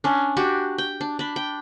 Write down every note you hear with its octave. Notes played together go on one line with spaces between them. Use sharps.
C#4 D4
D4 F#4 G4
G5
D4
D4 B5
G5